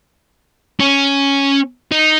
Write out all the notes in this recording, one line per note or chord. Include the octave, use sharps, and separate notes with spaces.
C#4
D#4